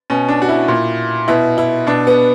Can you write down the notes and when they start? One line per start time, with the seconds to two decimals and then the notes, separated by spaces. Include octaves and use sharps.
0.10 B2 C#4
0.29 D4
0.42 F#4
0.49 E4
0.68 A#2
1.28 B2 E4
1.58 E4
1.87 B2 D4
2.07 B3